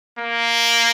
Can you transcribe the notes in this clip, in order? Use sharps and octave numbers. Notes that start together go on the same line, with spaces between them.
A#3